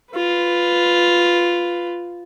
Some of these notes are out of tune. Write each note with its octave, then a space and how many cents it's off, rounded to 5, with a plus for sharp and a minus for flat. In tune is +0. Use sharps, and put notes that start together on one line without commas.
F4 +0 B4 +10